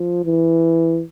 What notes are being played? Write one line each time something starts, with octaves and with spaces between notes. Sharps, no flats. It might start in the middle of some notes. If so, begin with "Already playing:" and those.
Already playing: F3
E3